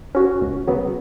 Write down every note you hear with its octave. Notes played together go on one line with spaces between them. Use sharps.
C#4 F#4
C#2
C#3 F#3 B3